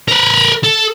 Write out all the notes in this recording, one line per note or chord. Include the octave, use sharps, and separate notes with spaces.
A#4 B4
A4